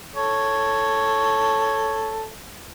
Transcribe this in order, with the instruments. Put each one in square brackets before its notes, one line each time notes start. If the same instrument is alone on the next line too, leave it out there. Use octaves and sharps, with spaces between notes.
[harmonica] A4 C#5